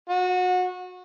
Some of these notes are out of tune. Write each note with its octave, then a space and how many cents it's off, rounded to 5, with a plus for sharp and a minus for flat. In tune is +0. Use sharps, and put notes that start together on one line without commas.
F#4 -25